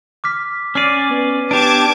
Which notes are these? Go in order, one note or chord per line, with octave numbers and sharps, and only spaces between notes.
D6 F6 B6
C#4 D5 F6 C7 D#7
B3
D4 G4 A5 D6 G#6 D7